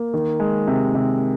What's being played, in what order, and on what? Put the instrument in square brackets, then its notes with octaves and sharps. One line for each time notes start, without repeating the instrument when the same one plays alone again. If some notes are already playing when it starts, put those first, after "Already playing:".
Already playing: [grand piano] A#3
D#3
G#3
C3
C3